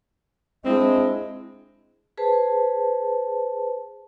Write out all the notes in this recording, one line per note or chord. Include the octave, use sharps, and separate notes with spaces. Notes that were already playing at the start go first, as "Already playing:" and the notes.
G#3 C4 D4 E4 D#5
G#4 B4 C5 A5